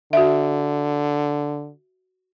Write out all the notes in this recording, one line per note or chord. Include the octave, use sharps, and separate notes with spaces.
D3 F#4 E5